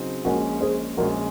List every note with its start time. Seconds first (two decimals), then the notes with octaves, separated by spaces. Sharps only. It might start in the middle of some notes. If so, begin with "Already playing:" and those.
Already playing: C#3 F#3 C4 D#4
0.25 A#1 A#2 G#3 C#4 F#4 A#4
0.61 G#4 C5
0.97 A#1 A#2 G#3 C#4 F#4 A#4